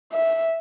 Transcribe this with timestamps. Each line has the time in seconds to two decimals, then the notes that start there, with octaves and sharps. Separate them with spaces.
0.13 E5